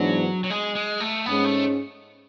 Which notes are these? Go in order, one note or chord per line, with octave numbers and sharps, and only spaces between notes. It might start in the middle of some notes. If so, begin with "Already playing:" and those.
Already playing: G#2 E3 F#3 B3 D4
F#3
G#3
G#3
A3
G#2 G#3 B3 C#4
A3